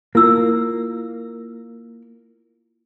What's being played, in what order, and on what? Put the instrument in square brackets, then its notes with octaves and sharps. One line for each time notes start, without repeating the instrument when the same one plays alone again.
[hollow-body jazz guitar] A#3 [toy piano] E4 F4 E6